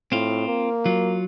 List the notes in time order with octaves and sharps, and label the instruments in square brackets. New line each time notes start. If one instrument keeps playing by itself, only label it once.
[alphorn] A2 [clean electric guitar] C4 F4
[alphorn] A#3
[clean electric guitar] F#3 F4